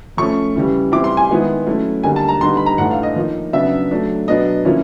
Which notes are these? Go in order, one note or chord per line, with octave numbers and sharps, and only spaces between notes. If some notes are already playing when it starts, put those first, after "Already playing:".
F3 A3 C#4 C#6
C#3 E3 G3
E3 G3 C4 E4 D6
C6
G#5
D#3 G#3 B3 E4
F#3 A3 C#4 E4
D3 G3 A#3 D#4 G#5
A5
A#5
D3 G3 B3 D#4 C6
B5
A#5
A2 E3 A3 D4 F#5
F5
D#5
F3 A#3 D#4
C#3 F#3 B3 D4 E5
F#3 A3 D4
B2 F#3 B3 D4 D#5
F3 A#3 C#4 E4